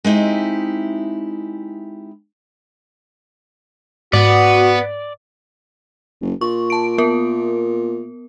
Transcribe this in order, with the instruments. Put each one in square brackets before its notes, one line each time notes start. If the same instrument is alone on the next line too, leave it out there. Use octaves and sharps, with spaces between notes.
[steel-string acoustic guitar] G#3 C4 D#4 E4 G4
[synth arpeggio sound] G#2 [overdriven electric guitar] B3 [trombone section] F#4 [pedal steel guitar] D5
[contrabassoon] F#1
[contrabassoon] A#2 [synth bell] C#6
[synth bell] A5 D7
B3 A#4